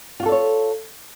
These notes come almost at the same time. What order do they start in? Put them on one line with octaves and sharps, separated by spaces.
F4 F#4 A4 D5 C#5